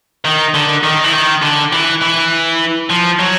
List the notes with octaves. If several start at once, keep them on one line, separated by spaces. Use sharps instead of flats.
D#3
D3
D#3
E3
D#3
D3
E3
E3
F3
F#3